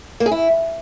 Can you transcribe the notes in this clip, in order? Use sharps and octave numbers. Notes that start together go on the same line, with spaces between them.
A#3
G#4
E4